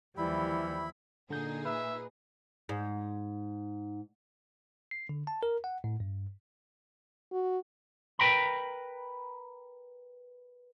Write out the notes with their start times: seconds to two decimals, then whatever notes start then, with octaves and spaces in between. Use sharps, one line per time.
0.17 D#2 E3 F3 G3 E4 B5
1.30 A#2 D3 D#4 G#4 G6
1.65 B4 E5
2.69 G#2
4.91 C7
5.09 D3
5.27 A5
5.43 A#4
5.64 F#5
5.84 A2
6.00 G2
7.32 F#4
8.19 A#4 B4 G5 A#5 B5